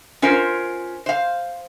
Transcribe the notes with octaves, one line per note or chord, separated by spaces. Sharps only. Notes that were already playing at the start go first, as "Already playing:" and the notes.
C#4 F4 A#4 C5
C5 F5